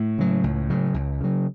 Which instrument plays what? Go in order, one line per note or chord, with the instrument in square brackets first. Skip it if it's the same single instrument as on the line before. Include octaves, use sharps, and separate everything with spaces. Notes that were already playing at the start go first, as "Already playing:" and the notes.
Already playing: [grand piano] A2
[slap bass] C#3 F#3
C#2
C#3 F#3
C#2
C#3 F#3